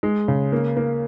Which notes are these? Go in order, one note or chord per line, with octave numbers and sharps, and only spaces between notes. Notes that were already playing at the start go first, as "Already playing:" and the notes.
G#3
C#3
A#3
A#3